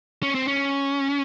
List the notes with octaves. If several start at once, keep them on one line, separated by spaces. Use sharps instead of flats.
C#4
C4
C#4